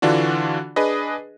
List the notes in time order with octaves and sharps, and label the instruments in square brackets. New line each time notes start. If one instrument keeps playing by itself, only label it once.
[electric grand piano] D3 E3 D4 F4 F#4
D4 G#4 B4 D#5